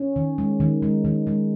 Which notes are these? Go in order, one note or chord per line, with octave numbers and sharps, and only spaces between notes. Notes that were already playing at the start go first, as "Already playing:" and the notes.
Already playing: C#4
D#3
G#3
D#3
G#3
D#3
G#3